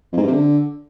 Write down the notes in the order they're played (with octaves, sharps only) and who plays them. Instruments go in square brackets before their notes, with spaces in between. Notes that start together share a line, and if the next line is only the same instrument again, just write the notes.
[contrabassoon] F2
G#2
G2
C3
D3